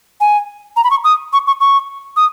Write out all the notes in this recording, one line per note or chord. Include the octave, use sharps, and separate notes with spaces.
G#5
A#5
B5
C#6
D#6
C#6
C#6
C#6
D#6